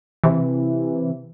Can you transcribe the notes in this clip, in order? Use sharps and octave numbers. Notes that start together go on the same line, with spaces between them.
C3 E3